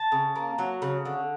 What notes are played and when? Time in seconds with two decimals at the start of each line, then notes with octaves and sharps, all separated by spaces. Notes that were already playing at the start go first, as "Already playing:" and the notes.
Already playing: A5
0.12 C#3
0.36 A#3
0.58 F#3
0.82 C#3
1.05 D3